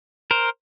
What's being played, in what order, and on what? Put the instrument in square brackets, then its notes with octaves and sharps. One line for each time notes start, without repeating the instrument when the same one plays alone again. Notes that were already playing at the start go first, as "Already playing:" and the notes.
[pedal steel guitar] A#4 C5